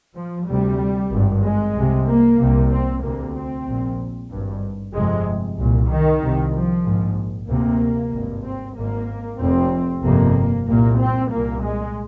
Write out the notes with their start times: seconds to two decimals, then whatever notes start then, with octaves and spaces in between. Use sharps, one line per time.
0.15 F3
0.48 D2 C3 G3
1.11 G#1 G2
1.43 G#3
1.75 C2 C3
2.07 A#3
2.39 C2 C3
2.71 C4
3.02 D2 C3 A#3
3.35 C4
3.66 A#1 A#2
4.30 G#1 G2
4.94 G1 F2 C3 G#3
5.58 C2 A#2
5.90 D#3
6.21 C2 C3
6.53 F3
6.85 A#1 G#2
7.48 D2 C3 A#3
8.12 G#1 G2
8.44 C4
8.76 G#1 G#2 A#3
9.40 F1 F2 C3 C4
10.04 G1 F2 C3 A#3
10.67 C2 A#2 A#3
10.99 C4
11.31 C2 A#2 A#3
11.63 G#3